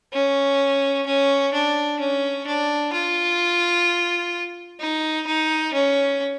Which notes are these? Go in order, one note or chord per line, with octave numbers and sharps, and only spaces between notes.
C#4
C#4
D4
C#4
D4
F4
D#4
D#4
C#4